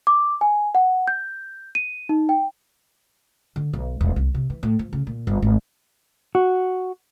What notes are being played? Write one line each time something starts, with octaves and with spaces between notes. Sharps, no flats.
D6
G#5
F#5
G6
D#7
D#4
G5
D3
B1
D#1
C2
C3
E3
A2
F3
C#3
A#2
G1
G#1
F#4